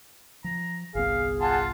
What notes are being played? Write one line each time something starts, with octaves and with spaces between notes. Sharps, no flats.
F3 A#5
G1 C2 B3 G#4 F5
F4 F#5 G#5 A5